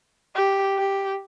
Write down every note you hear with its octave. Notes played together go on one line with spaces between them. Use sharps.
G4
G4